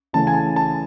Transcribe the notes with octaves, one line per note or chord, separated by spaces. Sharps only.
C#3 E3 A3 C#4 A5
G#5
A5
A5